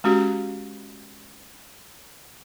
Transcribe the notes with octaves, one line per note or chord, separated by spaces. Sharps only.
G#3 C#4 F#4 G4